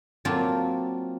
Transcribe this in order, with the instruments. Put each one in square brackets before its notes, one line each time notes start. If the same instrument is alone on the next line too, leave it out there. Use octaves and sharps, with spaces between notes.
[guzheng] F#3 A#3 C4 D4 F4 A5